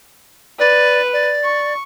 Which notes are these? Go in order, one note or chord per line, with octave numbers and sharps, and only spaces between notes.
B4 D5
D5
C#6